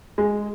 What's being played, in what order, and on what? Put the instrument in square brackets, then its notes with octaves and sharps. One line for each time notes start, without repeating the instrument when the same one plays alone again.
[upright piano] G#3